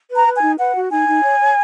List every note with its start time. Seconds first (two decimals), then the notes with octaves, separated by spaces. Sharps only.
0.09 B4
0.14 A#5
0.26 B4
0.37 G#5
0.42 D#4
0.58 B4 F#5
0.74 F#4
0.90 D#4 G#5
1.07 D#4
1.23 C#5
1.39 C#5